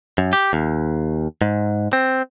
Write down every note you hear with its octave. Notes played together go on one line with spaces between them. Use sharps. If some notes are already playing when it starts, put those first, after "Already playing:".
F#2
G4
D#2
G#2
C4